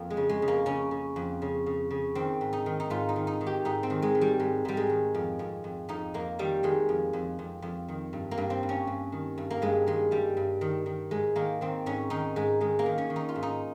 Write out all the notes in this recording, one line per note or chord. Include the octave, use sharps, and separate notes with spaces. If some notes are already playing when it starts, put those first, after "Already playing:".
Already playing: F2 A#3
G#3
C#3
G#3
C#3
A#3
C#3 C#4
C#3
F2
C#3
C#3
C#3
D#3 C4
G#2
D#4
D#3
D#4
G#2 F4
D#4
D#3
D#4
D#3
G4
G#2 D#4
C4
D#3
G#3
D#3
G3
G#2 G#3
G#2 G3
G#3
D#3
F2
F2
F2
F2 D#4
F2 A#3
D#3 G3
D#3 G#3
F2
F2
F2
F2
D#3
G2
A#3
G2
C4
G2
C#4
G2
D#3
G2
A#3
G2 G#3
D#3 G#3
G2 G3
G2
D#3
D#3
G#2 G#3
D#3 A#3
D#3 C4
G#2 C#4
D#3 D#4
G#2 G#3
D#3 G#3
A#3
D#3
C#4
D#3
D#4
F4
G#2
D#4